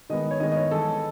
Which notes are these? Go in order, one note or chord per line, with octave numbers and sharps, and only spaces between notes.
D#3 G#3 B3 D#5
C#5
D#3 G#3 B3 D#5
D#5
C#5
E3 G#3 B3 A4